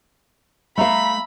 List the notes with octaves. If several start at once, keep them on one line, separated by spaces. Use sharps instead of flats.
A3 E5 F5 A#5 B5